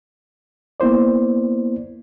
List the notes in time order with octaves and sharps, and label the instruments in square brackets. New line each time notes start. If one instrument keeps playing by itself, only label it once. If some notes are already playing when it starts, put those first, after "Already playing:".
[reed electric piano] A#3 B3 E4 C5 D5